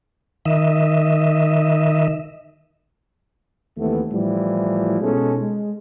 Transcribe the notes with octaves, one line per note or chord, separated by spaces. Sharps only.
D#3 D#5 E5
D#2 C3 E3 A3 B3
A2 E3 F3 G3
B2 G#3 C#4 D#4 A4
G#3